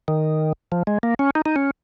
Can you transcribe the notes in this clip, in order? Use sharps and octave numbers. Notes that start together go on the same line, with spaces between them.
D#3
F3
G#3
A#3
C#4
D#4
D#4
C#4